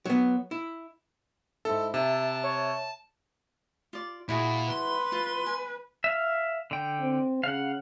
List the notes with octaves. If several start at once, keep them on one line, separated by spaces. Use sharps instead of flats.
F#3 B3
E4
G#2 E4 A4
C3 E5 A5
C#5
F4 D5
A#2 E4 F#4 G#4
B4 C6
F4
G#5
E5 F5
D3 G5
C4
C#3 F5 F#5